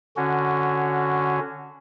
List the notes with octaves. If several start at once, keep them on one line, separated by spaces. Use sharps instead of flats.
D3 C#4 F#4